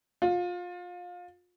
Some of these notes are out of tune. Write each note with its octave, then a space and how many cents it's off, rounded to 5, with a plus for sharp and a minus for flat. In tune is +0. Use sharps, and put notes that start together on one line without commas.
F4 +25